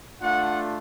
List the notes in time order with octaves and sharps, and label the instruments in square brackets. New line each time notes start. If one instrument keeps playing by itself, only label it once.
[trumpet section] A3 D4 F4 F#5